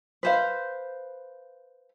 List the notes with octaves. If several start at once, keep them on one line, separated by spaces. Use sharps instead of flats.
B4 C5 F5